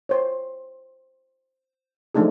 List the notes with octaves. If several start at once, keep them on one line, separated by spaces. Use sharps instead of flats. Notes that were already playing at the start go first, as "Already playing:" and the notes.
C5 C#5
F3 F#3 A3 D4 D#4 G#4